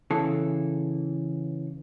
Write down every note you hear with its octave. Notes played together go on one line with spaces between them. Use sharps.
C#3 E3 A4